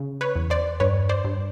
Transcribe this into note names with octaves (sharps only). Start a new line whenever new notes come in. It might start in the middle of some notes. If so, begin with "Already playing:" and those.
Already playing: C#3
B4 C#5
E2
C5 D5
G2 B4 C#5
C5 D5
G2